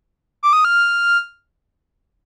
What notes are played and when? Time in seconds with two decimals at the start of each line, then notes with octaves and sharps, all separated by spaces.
0.43 D6
0.53 D#6
0.65 F6